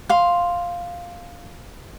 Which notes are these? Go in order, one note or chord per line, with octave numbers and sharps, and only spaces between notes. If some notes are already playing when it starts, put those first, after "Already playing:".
F5 C6